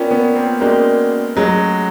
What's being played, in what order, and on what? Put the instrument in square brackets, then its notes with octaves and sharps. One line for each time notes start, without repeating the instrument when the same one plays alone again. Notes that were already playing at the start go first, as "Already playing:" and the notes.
Already playing: [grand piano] B3 C#4 [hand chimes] F4 A#4 D5 G5
[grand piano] B3 C#4
A#3 C4
[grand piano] G#3 A#3 [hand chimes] C#4 F#4 A#4 D5 G5
[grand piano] F#3 G#3 [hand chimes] A3 C#4 F4 G#4 C#5